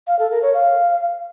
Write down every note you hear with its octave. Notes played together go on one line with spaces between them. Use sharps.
F5
A4
A#4
C#5
F5